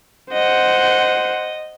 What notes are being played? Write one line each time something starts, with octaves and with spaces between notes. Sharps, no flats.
C5 D#5 F#5